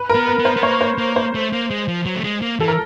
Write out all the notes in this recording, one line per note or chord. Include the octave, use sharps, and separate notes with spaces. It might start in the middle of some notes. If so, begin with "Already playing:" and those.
Already playing: B4
A#4
B3
B4
B3
C5
B3
A#3 C#5
C5
A#3
C5
A3
A#3
G#3
F3
F#3
A3
G#3
A#3
E3 A4
A#4